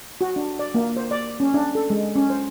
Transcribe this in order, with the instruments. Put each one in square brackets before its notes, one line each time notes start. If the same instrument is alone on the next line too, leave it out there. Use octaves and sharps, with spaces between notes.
[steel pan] F#4
D4
D5
A#3
C5
D5
C#4
D4
A4
G#3
C#4
C5